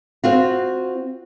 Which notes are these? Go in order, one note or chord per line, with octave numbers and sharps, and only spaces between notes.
C4 F4 F#4